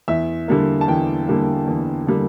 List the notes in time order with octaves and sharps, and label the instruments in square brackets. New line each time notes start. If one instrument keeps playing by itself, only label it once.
[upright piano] E2 E5
D3 G3 A#3
A5
E2 G5
D3 G3 A#3
E2
D3 G3 A#3